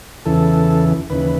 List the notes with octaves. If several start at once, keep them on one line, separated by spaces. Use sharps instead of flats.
E2 C#3 E3 A4
D#2 C#3 E3 B4